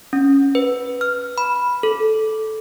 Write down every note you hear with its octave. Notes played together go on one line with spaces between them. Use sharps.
C#4
B4
F6
B5
A4